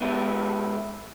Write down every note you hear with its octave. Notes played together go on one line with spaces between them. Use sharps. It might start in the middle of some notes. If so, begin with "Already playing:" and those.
B2 G#3 B3 E4 G4 A4